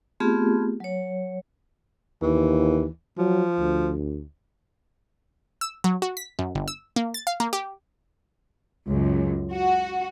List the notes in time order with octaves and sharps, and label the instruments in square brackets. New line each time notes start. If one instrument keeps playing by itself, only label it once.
[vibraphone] A3 B3 C4 F4 G4 G#4
F#3 C#5
[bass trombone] D#2 [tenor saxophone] E3
[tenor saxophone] F3 [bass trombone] F#3
[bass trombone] D2
[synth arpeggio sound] E6
F#3
F#4
B6
F#2
G1
E6
A#3
A6
F5
A#3
G4
[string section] C#2 F#2
F#4